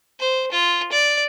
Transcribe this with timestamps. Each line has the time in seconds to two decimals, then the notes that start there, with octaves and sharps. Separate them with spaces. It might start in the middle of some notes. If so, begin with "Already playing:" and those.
0.19 C5
0.52 F4
0.92 D5